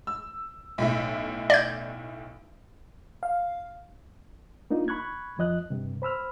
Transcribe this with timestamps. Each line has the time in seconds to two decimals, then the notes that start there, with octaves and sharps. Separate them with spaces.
0.07 E6
0.78 B1 A2 E5
1.50 D5 G6
3.23 F5
4.70 A#3 D4 D#4 F4
4.88 B5 C#6 F#6 G#6
5.38 F2 F3 D#5 F#6
5.70 G2 C3
6.02 C5 B5 E6 F6